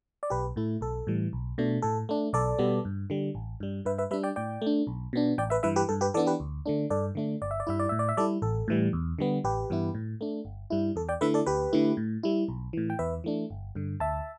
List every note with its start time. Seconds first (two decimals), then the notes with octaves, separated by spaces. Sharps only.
0.23 D5
0.30 B1 G4 B4
0.56 A2 A3 E4
0.81 B1 A4
1.07 A2 E3 G3
1.33 B1
1.58 B2 A3 D4
1.82 A2 A4
2.09 A3 D4
2.33 B1 A4 D5
2.58 B2 G3 B3
2.85 G2
3.10 D3 G3
3.35 A1
3.60 G2 G3
3.85 G2 B4 E5
3.98 B4 E5
4.11 G3 D4 B4 E5
4.23 D5 G5
4.36 A2 D5 G5
4.62 A3 D4
4.87 B1
5.13 B2 B3 D4
5.38 A1 D5 G5
5.50 B4 E5
5.63 G2 E3 B4 E5
5.76 G4 B4
5.89 G2 A4
6.01 G4 B4
6.14 E3 B3 D4 A4 D5
6.27 G4 B4
6.40 D2
6.66 D3 A3 D4
6.90 G2 A4 D5
7.15 D3 A3 D4
7.42 G1 D5
7.51 E5
7.60 D5
7.67 G2 G3 E4 E5
7.79 D5
7.89 A2 E5
7.99 D5
8.09 E5
8.17 G3 E4 A4 D5
8.42 A1 A4
8.68 A2 E3 G3
8.93 E2
9.19 D3 G3 B3
9.44 A1 G4 B4
9.70 G2 E3 B3 E4
9.95 A2
10.21 A3 D4
10.45 G1
10.70 G2 G3 E4
10.96 E2 A4
11.09 D5 G5
11.21 D3 A3 E4 B4 E5
11.34 A4 D5
11.46 D2 G4 B4
11.73 D3 A3 E4
11.97 A2
12.23 G3 E4
12.48 B1
12.73 A2 E3
12.90 G5
12.99 E2 B4 E5
13.24 E3 A3 D4
13.50 G1
13.75 G2 D3
14.00 D2 E5 A5